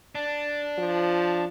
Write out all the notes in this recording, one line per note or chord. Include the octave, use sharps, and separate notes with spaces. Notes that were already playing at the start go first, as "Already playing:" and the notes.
D4
F3